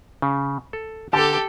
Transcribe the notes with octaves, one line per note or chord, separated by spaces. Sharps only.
C#3
A4
D3 G4 A4 A5